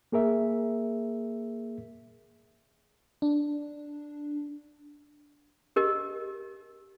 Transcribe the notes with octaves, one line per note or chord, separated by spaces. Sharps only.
A#3 G#4 A#4 E5
D4
G4 A#4 D#5